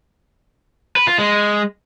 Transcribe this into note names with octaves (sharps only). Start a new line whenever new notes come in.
B4
F4
G#3